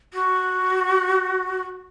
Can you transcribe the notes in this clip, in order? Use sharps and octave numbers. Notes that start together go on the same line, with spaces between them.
F#4